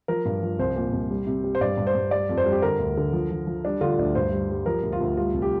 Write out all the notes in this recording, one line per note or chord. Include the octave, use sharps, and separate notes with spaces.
F3 A#4
G2
F3
C2 C5
A#2
C2
G3
C3
G3
C5
G2 D5
G2
C5
G2
G3 D5
F2
C5
G3
G4
D3 A#4
D2
D3
F3
F3
F3
G3 D4
D3 F4
D2 D4
G2 C5
G3
G3
F3 A#4
D2
F4
D2
G3 F4
C2
G4